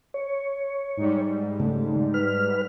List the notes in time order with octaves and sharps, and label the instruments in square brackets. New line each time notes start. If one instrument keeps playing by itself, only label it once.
[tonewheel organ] C#5
[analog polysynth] G#2 G3
[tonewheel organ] C#3 A3
B4 F6